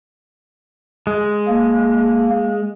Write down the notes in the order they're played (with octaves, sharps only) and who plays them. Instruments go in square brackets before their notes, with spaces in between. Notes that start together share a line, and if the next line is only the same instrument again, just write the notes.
[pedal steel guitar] G#3
[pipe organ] A#3